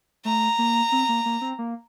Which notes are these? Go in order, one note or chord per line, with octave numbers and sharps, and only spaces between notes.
A3 A#5
A#3
C4
A#3
A#3
C4
A#3